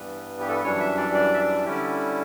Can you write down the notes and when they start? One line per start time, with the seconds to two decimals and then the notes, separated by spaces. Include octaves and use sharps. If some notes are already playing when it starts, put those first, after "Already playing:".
Already playing: G2 E3 G3 B3 B4
0.40 G4
0.49 A4
0.55 B4
0.63 F#2 E3 G3 D4 C#5
0.80 E5
0.97 D5
1.14 D5
1.33 E5
1.40 D5
1.65 D3 G3 C#4 E4 G4